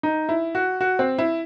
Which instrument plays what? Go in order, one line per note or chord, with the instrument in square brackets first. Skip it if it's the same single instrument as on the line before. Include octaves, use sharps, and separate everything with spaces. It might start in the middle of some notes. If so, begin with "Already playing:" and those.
[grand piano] D#4
E4
F#4
F#4
C4
E4